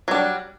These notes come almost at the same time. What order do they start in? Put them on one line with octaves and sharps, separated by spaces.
F#3 D4 G3